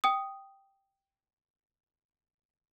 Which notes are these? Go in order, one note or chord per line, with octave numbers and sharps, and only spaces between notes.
G5 D#6